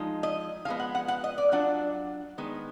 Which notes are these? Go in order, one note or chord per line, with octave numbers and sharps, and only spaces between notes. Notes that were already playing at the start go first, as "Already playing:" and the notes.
Already playing: F3 G#3 D#4
D#5
F3 G#3 B3 F5
F#5
F#5
F#5
D#5
D5
F#3 D4 F4 F#5
D#3 G#3 B3